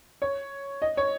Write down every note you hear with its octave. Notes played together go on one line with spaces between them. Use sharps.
C#5
D#5
C#5